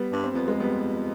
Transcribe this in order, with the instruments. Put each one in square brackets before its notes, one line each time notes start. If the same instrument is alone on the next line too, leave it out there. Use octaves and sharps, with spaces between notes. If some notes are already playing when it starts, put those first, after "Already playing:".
Already playing: [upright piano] G3 B3
[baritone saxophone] G2
[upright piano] C4
[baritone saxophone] F2 [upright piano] B3
[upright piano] G#3
G3 B3